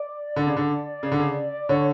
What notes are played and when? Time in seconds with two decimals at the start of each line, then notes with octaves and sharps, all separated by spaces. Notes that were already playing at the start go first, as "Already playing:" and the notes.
Already playing: D5
0.36 D3
0.47 C#3
0.56 D3
1.03 C#3
1.12 D3
1.19 C#3
1.69 D3 C#5